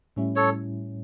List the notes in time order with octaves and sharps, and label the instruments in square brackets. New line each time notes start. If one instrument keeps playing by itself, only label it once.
[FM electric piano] A2 G3 C#4 E4
[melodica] A4 C#5